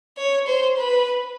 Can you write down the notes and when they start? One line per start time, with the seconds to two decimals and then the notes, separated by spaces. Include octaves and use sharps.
0.17 C#5
0.47 C5
0.77 B4